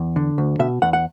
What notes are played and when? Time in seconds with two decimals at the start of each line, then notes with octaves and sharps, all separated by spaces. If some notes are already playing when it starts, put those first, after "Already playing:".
Already playing: E2
0.16 D3
0.38 D2
0.59 B2 E5
0.82 E2 F#5
0.93 F#5